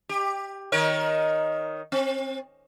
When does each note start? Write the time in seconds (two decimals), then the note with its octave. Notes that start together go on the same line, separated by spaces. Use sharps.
0.09 G4
0.72 D#3 A#4 C#5
1.92 C4